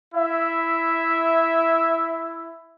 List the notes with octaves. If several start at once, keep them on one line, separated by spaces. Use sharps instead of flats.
E4 E5